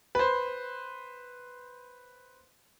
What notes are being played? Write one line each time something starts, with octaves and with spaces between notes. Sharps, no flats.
B4 C5